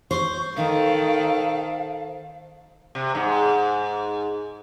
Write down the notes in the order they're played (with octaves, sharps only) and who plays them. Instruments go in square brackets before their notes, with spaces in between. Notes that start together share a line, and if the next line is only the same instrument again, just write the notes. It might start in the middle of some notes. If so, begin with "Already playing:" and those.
[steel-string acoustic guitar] C5 [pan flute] C#6
[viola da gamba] D#3 A4 [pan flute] F5
[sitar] C3
G#2